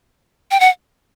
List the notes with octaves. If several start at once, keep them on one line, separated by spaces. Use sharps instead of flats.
G5
F#5